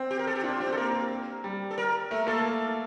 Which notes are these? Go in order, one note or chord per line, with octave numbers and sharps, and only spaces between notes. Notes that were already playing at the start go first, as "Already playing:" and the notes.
Already playing: C4
G4
A#4
A4
G4
D4 F4
C4 G4
A4
A#3 A#4
G3
A4
A#4
A3 A#4
A#3 A4